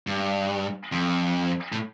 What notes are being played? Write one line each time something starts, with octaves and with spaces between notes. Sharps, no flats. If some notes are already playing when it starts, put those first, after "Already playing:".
G2
F2
A2